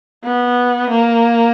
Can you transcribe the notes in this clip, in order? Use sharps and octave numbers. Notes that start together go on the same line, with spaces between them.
B3
A#3